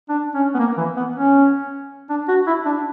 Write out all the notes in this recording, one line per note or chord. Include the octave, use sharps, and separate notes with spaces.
D4
C#4
B3
A#3
E3
B3
C#4
D4
F#4
E4
D4